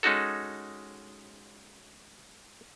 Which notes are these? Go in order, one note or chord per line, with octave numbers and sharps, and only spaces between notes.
G#3 C#4 D#4 F#4 A4